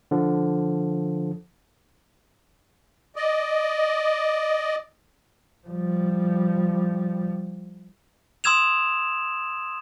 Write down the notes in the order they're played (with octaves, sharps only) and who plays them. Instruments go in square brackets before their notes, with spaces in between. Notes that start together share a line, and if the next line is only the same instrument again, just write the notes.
[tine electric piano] D3 F3
[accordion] D5 D#5
[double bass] F3 G3
[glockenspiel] C6 D#6 E6 G#6 E7 F7